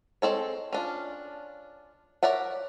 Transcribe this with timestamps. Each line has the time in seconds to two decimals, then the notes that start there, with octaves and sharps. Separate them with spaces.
0.22 G#3 C4 A4 C#5
0.73 C#4 D4 F4
2.23 A#4 C#5 D5 E5 F#5